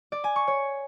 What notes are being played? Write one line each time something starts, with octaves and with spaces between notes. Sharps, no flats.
D5
G#5
C#6
C#5